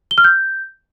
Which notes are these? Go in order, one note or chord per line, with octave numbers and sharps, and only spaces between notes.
G7
F6
G6